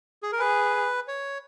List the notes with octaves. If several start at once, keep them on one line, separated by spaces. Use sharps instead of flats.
G#4
A#4
G#4 B4
C#5